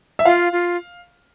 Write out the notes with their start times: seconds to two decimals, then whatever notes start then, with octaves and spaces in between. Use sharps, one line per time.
0.19 E5
0.25 F4 F5
0.52 F4